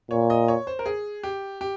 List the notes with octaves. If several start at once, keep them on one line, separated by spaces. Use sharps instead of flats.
A#2 C#5
D#5
C#5
C5
A#4
G#4
G4
G4